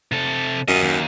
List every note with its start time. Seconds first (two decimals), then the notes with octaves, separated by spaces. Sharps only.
0.12 C3 A4
0.68 F#2 F4 D#5
0.81 D#2